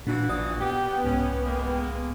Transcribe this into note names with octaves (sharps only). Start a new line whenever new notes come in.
A#2 E3 D4 F#4
A#1 D5 D#6
B3 G4 G5
C2 G#2 C#4
G#3 A#3